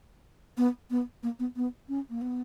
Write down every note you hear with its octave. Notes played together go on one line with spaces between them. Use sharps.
B3
B3
A#3
B3
B3
C#4
A#3
B3